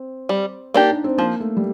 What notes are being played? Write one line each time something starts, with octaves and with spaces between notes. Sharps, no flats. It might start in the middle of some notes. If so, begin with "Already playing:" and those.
Already playing: C4
G3
A#3 D4 D#4 G4
D4
C4
F3 A#3
A3
G3